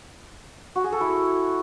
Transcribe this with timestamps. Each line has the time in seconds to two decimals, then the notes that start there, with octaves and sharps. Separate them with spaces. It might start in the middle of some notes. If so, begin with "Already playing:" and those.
0.76 F#4
0.84 G#4
0.92 A4
1.01 E4